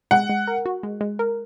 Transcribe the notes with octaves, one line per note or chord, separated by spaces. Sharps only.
G#3 F#5
G#3
A#4
F#4
G#3
G#3
A#4